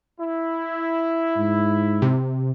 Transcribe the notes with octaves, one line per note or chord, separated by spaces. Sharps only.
E4
G#2
C3